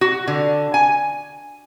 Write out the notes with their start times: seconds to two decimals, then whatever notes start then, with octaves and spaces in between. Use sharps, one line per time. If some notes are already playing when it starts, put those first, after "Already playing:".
0.01 F#4
0.27 D3
0.74 G#5